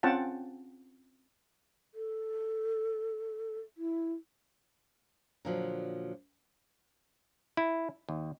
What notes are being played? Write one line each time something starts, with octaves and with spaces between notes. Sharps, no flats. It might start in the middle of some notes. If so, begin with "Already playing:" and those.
C4 C#4 F4 F#5 G5 A5
A4
E4
A#2 D3 F3 F#3
E4
D#2